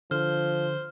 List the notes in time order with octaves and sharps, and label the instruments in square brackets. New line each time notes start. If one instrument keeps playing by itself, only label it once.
[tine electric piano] D3 [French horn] F3 [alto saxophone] C5 [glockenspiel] F6